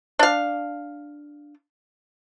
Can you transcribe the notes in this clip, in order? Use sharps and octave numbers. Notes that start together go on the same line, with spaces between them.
D4 F5